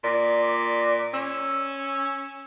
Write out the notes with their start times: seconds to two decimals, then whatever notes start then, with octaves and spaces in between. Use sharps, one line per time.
0.04 A#2 D5
1.14 C#4 E6